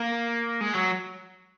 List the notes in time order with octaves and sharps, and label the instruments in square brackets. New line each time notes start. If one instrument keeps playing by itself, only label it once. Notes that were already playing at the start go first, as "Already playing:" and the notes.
Already playing: [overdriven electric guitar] A#3
G#3
F#3